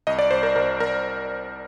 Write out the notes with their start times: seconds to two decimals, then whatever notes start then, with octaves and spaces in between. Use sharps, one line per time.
0.07 C2 D#5
0.19 D5
0.31 C2 C5
0.43 A#4
0.56 C2 A#4
0.80 C2 A#4